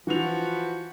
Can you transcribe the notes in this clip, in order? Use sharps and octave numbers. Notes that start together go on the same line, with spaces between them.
E3 F3 F#4 B4 F7